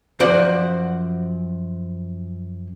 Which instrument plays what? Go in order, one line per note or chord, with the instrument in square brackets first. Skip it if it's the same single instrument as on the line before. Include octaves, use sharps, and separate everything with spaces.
[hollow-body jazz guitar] F#2 F3 F#4 C5 D5 F#5